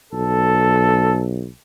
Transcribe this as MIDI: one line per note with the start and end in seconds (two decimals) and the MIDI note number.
0.13 1.48 35
0.13 1.21 69